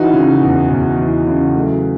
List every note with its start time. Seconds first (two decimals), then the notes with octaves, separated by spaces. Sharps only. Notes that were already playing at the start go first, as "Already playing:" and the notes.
Already playing: E3 D#4 F#4
0.13 C#3
0.41 E2
0.70 E2
0.98 E3
1.26 C#3
1.54 F#3 A3